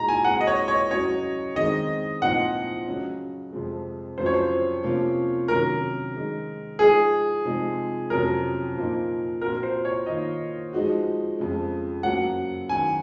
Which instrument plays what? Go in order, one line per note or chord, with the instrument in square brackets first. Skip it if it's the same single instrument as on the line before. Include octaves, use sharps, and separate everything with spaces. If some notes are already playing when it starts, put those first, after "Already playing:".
Already playing: [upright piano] A#2 G#3 D#4 F#4 [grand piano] A#5
[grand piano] G#5
[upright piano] A#2 G#3 C4 F#4 [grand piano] F#5
[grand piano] D#5
C#5
C#5
[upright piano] C#3 F#3 C#4 F#4 [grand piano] C#5
[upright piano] D#3 G#3 C4 D#4 [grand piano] D#5
[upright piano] A#2 F3 C4 D#4 [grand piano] F#5
[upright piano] C#3 F#3 C#4
F2 C3 F3 G#3 C4
[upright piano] F2 C#3 F#3 C#4 F4 [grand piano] C5
[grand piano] C#5
C5
[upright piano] C3 F3 A#3 C#4 F4
[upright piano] C3 D#3 F#3 C#4 [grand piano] A#4
[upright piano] D#3 G#3 D#4
[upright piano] F3 G#3 D#4 [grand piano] G#4
[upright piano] C3 F3 G#3 D#4
[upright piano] F2 C3 F#3 C#4 [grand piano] A#4
[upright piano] A#2 F3 A#3 D#4
[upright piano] A#2 F3 C4 F#4 [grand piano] A#4
[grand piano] C5
C#5
[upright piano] D#3 A#3 F4 [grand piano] D#5
[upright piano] F3 G#3 D#4 F#4
F2 C#3 G#3
[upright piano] F#2 C#3 F#3 A#3 [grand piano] F#5
[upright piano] D#3 F#3 C#4 F#4 [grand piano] G#5